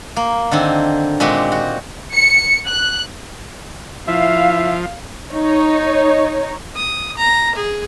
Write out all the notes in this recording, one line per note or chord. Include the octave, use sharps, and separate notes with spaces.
A#3
D3 D#3 C4
A#2 G#3 C4 F#4 G4
F#4
C#7
F#6
F3 E4 E5 F5
D#4 C#5
D#6
A#5
G#4